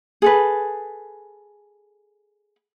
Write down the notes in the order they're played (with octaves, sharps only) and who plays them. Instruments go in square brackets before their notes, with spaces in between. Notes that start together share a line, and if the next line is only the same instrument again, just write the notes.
[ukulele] G#4 A4 B4